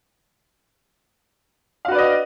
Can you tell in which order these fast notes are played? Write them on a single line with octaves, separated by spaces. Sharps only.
F5 F#4 B4 D5 D#5